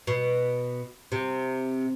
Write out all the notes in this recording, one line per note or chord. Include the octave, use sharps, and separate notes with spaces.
B2
C3